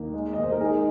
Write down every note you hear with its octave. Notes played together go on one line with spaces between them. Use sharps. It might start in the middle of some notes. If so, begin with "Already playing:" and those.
Already playing: D#2 A#3 D#4
G#3
D#2 D#5
C5
A#4
G#3 D#4 G#4